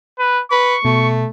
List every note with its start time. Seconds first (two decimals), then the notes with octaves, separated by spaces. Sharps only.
0.19 B4
0.51 B4 C#6
0.85 B2 A3